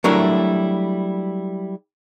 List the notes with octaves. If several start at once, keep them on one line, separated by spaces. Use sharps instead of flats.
F#3 G3 A3 D4 E4 A#4